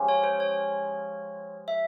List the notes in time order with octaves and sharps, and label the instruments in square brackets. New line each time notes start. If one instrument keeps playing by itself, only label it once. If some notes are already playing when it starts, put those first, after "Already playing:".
Already playing: [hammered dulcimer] F3 G#3 C#4 G4
[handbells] C#5
C5
C#5
E5